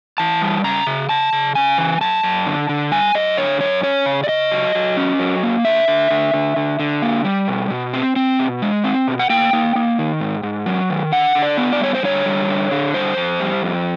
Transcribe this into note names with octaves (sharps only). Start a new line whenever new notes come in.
E3 A5
G3
C#3 A#5
C#3
C#3 A5
C#3
C#3 G#5
E3
F#2 A5
F#2
D3
D3
G3 G#5
F#2 D#5
D3 C#5
F#2 C#5
C#4 C#5
C#3
D5
C#3 D#5
F#3
F#3
C#4
F#3
A#3
D3 E5
D3
D3
D3
D3
D3
A#3
G3
B2
B2
C4
C4
B2
G#3
C4
B2
F#5
A#3 G5
A#3
A#3
D#3
G#2
G#2
F#3
D#3
D3 F#5
D3
D5
B3
D5
G3 C#5
C5
D3 C#5
G3
D3
D3
G3 C5
F2
G3
F2